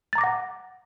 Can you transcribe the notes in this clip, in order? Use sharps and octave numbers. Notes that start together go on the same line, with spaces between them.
F#5 A#5 D6 A6 A#6